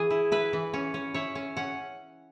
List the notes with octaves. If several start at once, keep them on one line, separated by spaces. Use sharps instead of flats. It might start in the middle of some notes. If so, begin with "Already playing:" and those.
Already playing: E3 G#4
E4
E4 B4
E3
C#4
C#4
E4 C#5
C#4
C#4 F#5